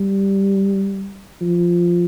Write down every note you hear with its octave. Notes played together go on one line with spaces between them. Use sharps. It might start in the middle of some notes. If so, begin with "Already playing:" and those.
Already playing: G3
F3